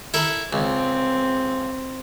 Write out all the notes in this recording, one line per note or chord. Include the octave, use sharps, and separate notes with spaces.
E4 A4 A#4
C#2 C4